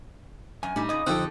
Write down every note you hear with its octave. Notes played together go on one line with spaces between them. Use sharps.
F#2 G#5
A2 G3 A3 D4 D#4
A#2 C#3 D#4 D#5 B5 D#6
F2 D3 C4 D#4 G4 A4 F#6